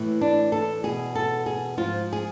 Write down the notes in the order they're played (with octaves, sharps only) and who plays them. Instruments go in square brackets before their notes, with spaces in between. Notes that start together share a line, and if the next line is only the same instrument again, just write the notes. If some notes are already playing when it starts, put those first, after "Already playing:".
Already playing: [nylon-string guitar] A2 E3
D4
A4
E2 B2 G#4
A4
G#4
G#2 F3 F4
G#4